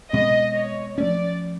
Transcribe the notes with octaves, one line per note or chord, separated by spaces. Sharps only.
B2 G#3 C4 D#5
C#5
F3 A3 C#4 D5